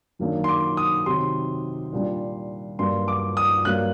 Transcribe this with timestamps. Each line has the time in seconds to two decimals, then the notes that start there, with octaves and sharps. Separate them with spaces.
0.19 F#2 D#3 F#3 A#3 D4
0.44 C6
0.49 D6
0.77 D#6
1.06 C3 D#3 F#3 C6
1.92 A#2 G3 D4
2.79 G2 F#3 A#3 D4 C6
3.08 D6
3.37 D#6
3.65 G2 F#3 A#3 D4 F#6